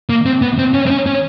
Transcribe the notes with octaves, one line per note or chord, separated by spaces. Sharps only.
A#3
C4
B3
C4
C#4
C4
C#4
C#4